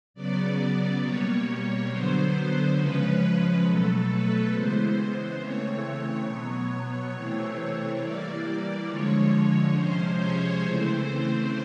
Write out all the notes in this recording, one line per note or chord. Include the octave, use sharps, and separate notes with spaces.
C#3 F#3 B3 D5
B2 G3 A#3 C#5
D3 F#3 B3 C5
C#3 F3 G#3 C#4 B4
B2 F#3 A3 A4
B4
C#3 E3 G#3 B3 C5
C#3 E3 A3 C4 C#5
B2 F#3 B3
C3 E3 A3 C4
E3 G3 A#3 D5
D3 F3 G#3 C#5
C3 F3 G#3 C#4 C5
C#5
C#3 E3 A3 C4 C5